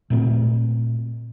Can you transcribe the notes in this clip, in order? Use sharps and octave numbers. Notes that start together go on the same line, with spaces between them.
A#2 A3 C4